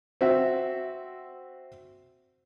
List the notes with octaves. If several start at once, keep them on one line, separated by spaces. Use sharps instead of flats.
C4 F#4 E5